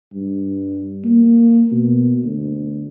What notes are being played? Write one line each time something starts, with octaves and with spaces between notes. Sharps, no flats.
G2
A#3
B2
D2